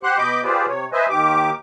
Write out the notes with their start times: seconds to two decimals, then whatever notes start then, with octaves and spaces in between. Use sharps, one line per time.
0.03 G4 C5 F#5 C6 F#6
0.18 B2 D#5 B5 D6 G6
0.44 F4 G4 G#4 B4 C5 D5
0.68 C3 C#5
0.92 B4 C5 D#5 E5 G#5
1.10 D#2 D#3 G4 D6